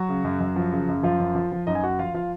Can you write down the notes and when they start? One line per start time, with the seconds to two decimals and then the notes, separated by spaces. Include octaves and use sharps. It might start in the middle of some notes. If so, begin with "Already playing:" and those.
Already playing: F#3 F#4
0.09 C#3
0.24 F#2
0.40 F#2
0.56 F3
0.72 C#3
0.89 F#2
1.03 F#2 F3 F4
1.20 F#2
1.35 F3
1.52 F3
1.67 F#2 D#4 D#5
1.75 G#5
1.82 F#2 F#4 F#5
1.99 F3 F4 F5
2.14 F3 F4 F5